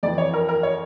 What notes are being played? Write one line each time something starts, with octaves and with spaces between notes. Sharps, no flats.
F2 E3 D5
C#5
A#4
A#4
C#5